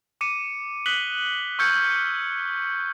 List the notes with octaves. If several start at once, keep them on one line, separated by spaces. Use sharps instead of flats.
D6 C#7 D#7
D#6 F#6 B6 F#7 G7
C#6 E6 F6 G6 G#6 C#7